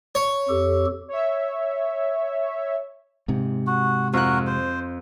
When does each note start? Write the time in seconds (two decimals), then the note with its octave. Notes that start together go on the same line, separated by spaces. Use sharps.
0.15 C#5
0.49 F2 G4 A4
1.08 C#5 E5
3.28 G#2 C3
3.67 F#4
4.13 F2 F#4 A#4 F#6
4.47 C5